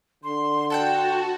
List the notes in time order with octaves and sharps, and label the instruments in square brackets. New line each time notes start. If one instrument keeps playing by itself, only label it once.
[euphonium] D3 [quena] C6
[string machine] F#4 [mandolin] A4 F#5 G5 [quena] A5